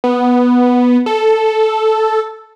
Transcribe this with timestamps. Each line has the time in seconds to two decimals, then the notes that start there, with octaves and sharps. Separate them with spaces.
0.04 B3
1.06 A4